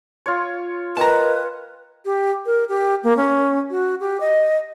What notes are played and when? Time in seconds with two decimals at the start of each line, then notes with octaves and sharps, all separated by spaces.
0.26 F4 C#5
0.97 A#4 B4 D#5 G5 A5 A#5
2.05 G4
2.46 A#4
2.69 G4
3.03 A#3
3.17 C#4
3.70 F#4
4.00 G4
4.20 D#5